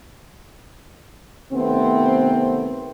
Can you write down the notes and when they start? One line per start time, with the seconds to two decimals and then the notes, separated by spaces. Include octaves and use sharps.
1.53 C3 D#3 A3 B3 C4